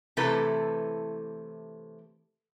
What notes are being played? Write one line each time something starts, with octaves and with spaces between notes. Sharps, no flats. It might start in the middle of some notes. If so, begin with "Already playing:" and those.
C3 E3 A3 E4 A4 B4